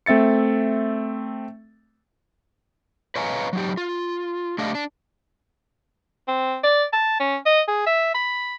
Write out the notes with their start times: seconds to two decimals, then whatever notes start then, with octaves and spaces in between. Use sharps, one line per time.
0.06 A3 C4 E5 A6 C#7
3.16 B4 C#5 D#5 F5 G#5 A#5
3.53 F#3 D#4 G4
3.77 F4
4.58 A3 D4 G4 D#5 F5
4.75 D4
6.28 C4
6.64 D5
6.93 A5
7.20 C#4
7.46 D#5
7.68 G#4
7.87 E5
8.15 B5